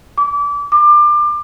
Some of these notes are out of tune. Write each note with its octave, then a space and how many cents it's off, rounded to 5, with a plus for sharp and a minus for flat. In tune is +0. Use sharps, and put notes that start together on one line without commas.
D6 -30
D6 +30